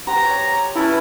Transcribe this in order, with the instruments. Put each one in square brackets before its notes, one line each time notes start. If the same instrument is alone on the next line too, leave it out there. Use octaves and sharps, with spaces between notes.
[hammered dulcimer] G4 C5 F#5 [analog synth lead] A#5
[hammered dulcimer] C#5
[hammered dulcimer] C#4 A4 B4 [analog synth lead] E4